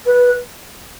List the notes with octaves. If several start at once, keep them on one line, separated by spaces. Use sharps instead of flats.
B4